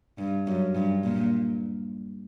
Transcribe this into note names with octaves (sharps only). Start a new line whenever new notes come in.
G2
F#2
G2
A#2